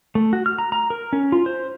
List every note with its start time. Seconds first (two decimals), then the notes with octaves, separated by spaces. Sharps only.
0.15 A3
0.33 F#4
0.46 F6
0.58 A#5
0.72 A#5
0.90 A#4
1.13 C#4
1.32 F4
1.46 C5